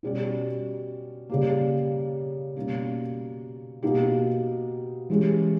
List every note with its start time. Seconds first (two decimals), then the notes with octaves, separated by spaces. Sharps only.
0.03 B2 G3 C#4 G4
1.30 C#3 G3 A#3
2.56 B2 G3 A#3 C#4
3.83 B2 A#3 D#4 G4
5.10 E3 G#3 C#4 G4